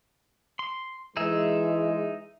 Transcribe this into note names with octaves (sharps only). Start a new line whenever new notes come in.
C6
E3 G#3 D#4 G#4 E5